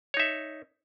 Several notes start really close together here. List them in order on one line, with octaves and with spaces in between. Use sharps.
C#5 D#4 E5